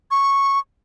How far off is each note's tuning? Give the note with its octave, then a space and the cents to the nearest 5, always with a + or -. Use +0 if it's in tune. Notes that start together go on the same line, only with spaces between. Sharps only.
C#6 -10